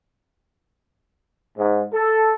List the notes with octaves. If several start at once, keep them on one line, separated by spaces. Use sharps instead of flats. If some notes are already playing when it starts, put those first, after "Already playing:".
G#2
A4